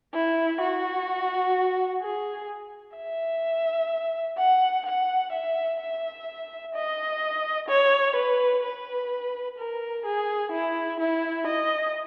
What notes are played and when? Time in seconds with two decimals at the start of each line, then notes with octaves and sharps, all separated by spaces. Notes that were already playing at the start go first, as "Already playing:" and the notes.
0.14 E4
0.61 F#4
2.02 G#4
2.96 E5
4.38 F#5
4.86 F#5
5.32 E5
5.80 E5
6.74 D#5
7.69 C#5
8.16 B4
8.63 B4
9.58 A#4
10.06 G#4
10.52 E4
11.00 E4
11.47 D#5